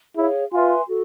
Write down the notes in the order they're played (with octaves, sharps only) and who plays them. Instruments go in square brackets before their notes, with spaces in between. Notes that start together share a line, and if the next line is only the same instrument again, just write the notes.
[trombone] E4 [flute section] G#4 C#5 F5
[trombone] F4 [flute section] B4 E5 G#5 C6
[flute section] F#4 A4